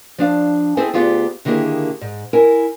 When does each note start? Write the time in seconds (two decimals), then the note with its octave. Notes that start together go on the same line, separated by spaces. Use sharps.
0.18 F3 D4 F5
0.77 C4 E4 G#4 A4 C5
0.94 D2 F3 B3 F4 G4 G#4
1.45 D3 D#3 A#3 E4 G4 G#4
2.01 G#2
2.33 E4 A#4 G#5